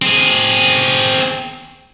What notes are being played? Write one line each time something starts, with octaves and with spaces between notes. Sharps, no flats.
C4 G#4